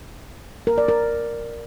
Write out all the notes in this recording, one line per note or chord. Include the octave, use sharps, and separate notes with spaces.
A#4
D5
A#4